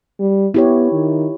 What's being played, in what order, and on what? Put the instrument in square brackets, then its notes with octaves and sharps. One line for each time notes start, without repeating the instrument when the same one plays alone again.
[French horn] G3
[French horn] B3 [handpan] E4 G4 C#5
[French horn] D#3